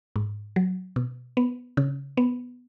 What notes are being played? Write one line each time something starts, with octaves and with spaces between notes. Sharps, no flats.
G#2
F#3
B2
B3
C#3
B3